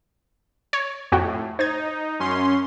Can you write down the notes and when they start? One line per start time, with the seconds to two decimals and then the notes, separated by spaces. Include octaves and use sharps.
0.73 C#5
1.12 F2 A2 F#4 G5
1.59 D#4 C5 G#6
2.20 F#2 C#4 C6